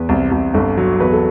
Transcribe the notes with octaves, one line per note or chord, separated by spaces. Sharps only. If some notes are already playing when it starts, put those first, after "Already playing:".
Already playing: E2 B4
C2
C2
G1 A4
F#3
E2 B4
A4